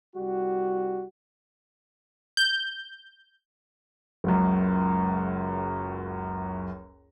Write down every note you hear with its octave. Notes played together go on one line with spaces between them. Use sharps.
C2 G3 F#4
G6
F#1 C#2 F#2